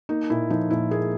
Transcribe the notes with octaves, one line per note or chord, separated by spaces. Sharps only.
A#3 D#4
A#2 E4
F3 D#4
A#2 E4
A#3 G#4